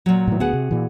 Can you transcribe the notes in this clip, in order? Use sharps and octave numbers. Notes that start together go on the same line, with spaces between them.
A#2 F#3
A2 E3
D2 B3 F#4 G#4 F#5
C3
A#2 E3